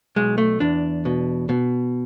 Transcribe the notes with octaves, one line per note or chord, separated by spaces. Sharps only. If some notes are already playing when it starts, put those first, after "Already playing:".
B1 G#3
A3
E2 D4
B2
B2